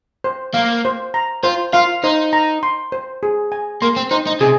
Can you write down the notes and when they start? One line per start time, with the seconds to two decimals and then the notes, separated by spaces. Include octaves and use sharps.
0.24 C5
0.54 A#3 F5
0.85 C5
1.14 A#5
1.43 F4 C5
1.73 F4 F5
2.04 D#4 C5
2.33 A#5
2.63 C6
2.92 C5
3.23 G#4
3.52 G#5
3.82 A#3 C6
3.96 C4
4.11 D#4 C5
4.27 D#4
4.41 C3 G#4